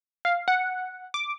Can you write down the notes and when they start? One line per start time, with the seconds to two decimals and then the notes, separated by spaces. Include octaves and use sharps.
0.25 F5
0.48 F#5
1.14 D6